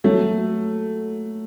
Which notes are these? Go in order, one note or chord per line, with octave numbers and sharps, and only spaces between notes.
F#3 A3